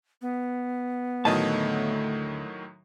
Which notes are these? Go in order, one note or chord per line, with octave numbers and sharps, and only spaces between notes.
B3
D2 A2 D#3 F#3 A3 D#5 A5